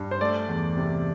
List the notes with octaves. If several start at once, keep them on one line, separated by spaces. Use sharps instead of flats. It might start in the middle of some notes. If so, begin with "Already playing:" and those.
Already playing: G2
C5
A3 D5
E2
C3